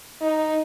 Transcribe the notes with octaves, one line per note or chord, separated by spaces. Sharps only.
D#4